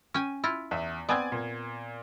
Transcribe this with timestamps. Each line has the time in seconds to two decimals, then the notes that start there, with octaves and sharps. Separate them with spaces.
0.14 C#4 G5 G#5
0.44 E4 F4
0.71 E2 E5
1.09 B3 C4 D5 G#5 G#6
1.32 A#2